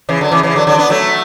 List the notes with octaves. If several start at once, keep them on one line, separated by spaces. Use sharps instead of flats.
C#3 E3
D3 F#3
C#3 E3
C#3 E3
D3 F#3
D3 F#3
B3 D4
F#3 A3